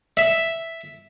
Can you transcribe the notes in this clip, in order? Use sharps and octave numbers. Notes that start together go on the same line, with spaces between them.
E5